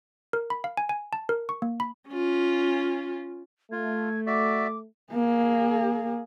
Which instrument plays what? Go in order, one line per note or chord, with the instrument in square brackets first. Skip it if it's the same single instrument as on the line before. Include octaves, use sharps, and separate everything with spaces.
[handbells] A#4
B5
F5
G#5
G#5
A5
A#4
C#6
A#3
B5
[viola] C#4 F4
[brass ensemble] A3 [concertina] F4 [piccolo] G#6
[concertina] F#4 D5 E5 [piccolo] D6
[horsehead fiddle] A#3 G#4